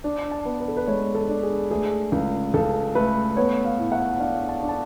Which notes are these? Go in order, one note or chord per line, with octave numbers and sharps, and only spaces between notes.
D4
A5
B3
B4
A4
B4
G#3 C#5
A4
D4
G#4
A3 G#4
C#2
C#2 A4
A3 B4
B3 C#5
F5
A2
F#5
D4 F5
A5
D4
A5